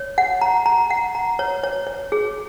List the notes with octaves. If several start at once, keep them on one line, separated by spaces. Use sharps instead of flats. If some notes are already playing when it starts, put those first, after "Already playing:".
Already playing: C#5
F#5
A#5
A#5
F#5
A#5
C#5
C#5
C#5
G#4